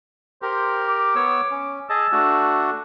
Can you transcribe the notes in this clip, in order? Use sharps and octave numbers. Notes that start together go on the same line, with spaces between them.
G4 A#4 C5
D6
B3 C#5 E6
C#4
G#4 D#5 A5 E6
A3 D4 F#4